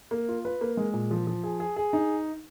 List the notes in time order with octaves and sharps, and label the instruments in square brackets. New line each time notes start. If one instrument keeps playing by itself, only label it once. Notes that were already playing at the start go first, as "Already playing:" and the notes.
[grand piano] A#3
F4
B4
A#3
G#3
A#2
F3
F3
G#4
G#4
G#4
D#4